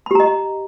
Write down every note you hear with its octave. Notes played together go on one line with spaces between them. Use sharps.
G4 D#5 A#5 B5